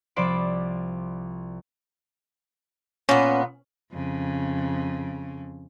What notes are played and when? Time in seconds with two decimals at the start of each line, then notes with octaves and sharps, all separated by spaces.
0.16 C2 F3 C5 D5 B5 D7
3.09 A#2 B3 C#4
3.93 F2 C#3